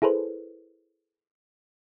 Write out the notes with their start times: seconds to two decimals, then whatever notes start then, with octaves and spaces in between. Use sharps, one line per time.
0.02 E4 G#4 A4 B4 C5